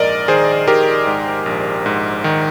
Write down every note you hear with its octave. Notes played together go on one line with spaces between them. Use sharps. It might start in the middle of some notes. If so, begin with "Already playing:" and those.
Already playing: A#1 G#2 A#4 D5 D#5
D#3 G#4 C5
D#3 G4 A#4
G#2
A#1
G#2
D#3